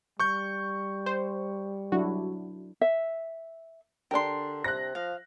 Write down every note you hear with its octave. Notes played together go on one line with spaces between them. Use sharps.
G3 C#6 G6
C5
F#3 D4 E4 F#4
E5
D3 D4 G4 A#4 C6
C3 F#6 A#6
F3 F5